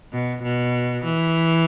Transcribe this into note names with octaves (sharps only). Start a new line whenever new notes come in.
B2
B2
E3